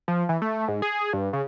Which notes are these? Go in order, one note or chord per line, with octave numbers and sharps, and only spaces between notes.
F3
E3
A3
G#2
G#4
G2
C#3